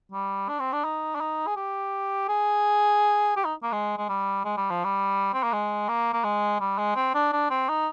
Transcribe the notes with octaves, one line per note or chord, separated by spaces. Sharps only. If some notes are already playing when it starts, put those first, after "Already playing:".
G3
D4
C4
D4
D#4
D4
D#4
G#4
G4
G#4
G4
D#4
A#3
G#3
G#3
G3
G#3
G3
F3
G3
C4
A#3
G#3
A#3
A#3
G#3
G3
G#3
C4
D4
D4
C4
D#4